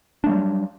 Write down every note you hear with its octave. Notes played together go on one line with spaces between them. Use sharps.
F#3 G3 A3 D4